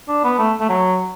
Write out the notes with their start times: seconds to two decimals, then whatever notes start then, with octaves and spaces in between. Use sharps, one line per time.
0.08 D4
0.24 B3
0.39 A3
0.60 A3
0.69 F#3